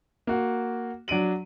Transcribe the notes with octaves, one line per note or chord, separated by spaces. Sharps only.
A#3 F#4
F#3 D4 D7 D#7 F#7